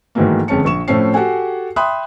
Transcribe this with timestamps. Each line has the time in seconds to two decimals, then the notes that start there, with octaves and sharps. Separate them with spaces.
0.15 G#2 D#3 E3 F#3 A3 A#3
0.48 G1 F2 G#3 C#4 A5 C#7
0.65 A#1 C#6 E7
0.88 A2 F3 A3 C4 C#4 C7
1.14 F#4 G4 A4 F#5 G#5
1.76 E5 G5 B5 C6 D#6 F#6